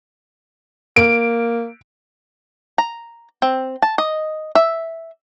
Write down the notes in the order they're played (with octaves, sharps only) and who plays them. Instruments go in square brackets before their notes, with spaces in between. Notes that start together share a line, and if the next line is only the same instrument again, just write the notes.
[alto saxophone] A#3 [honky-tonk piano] D7
[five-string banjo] A#5
C4
A5
D#5
E5